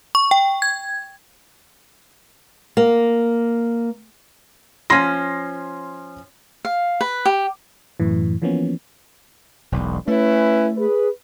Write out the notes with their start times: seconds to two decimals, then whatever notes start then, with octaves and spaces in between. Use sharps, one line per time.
0.15 C#6
0.31 G5
0.62 G#6
2.77 A#3
4.90 F3 C#4 C6 A#6
6.65 F5
7.01 B4
7.25 G4
8.00 F#2 A2 E3
8.42 E3 F3 A#3 B3 C#4
9.72 E1 B1 E2
10.08 A3 C#4 E4 B4
10.78 G#4 B4